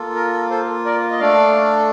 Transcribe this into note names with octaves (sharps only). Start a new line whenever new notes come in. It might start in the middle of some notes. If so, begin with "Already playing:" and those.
Already playing: A#3 F4 A4
A#4
A4 C5
A#4 D5
D#5
A3 D4 A4 D5 F5